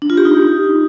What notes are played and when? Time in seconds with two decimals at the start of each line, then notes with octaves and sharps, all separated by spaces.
0.02 D4
0.10 F4
0.17 G4
0.25 D#4